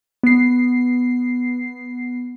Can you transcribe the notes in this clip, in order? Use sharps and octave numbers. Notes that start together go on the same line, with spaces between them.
B3 C7